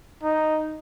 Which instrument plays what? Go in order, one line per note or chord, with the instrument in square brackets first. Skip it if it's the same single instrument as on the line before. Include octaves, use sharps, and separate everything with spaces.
[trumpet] D#4